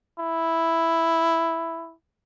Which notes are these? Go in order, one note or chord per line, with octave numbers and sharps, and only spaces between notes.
E4